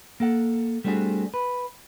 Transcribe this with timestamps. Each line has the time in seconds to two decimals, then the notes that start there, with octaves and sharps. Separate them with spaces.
0.20 A#3 A4 F#5
0.84 G3 A3 C4 D4 F#4 G#4
1.34 B4